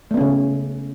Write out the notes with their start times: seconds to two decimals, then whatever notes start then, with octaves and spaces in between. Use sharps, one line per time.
0.11 A3
0.14 B3
0.17 C#4
0.21 C#3